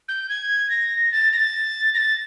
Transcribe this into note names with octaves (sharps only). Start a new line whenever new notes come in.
G6
G#6
A#6
A6
A#6
A6
A#6
A6